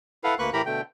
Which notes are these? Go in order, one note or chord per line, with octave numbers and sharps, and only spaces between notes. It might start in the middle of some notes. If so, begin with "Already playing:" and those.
E4 A4 B4 F5 F#5
D2 A#3 B4 C#6 F#6
A2 E3 G4 A#4 A#5 B5
B2 D3 A3 G5